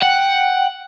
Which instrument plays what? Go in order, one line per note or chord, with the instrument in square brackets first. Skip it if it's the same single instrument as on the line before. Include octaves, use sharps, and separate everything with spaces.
[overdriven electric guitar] F#5 [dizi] G5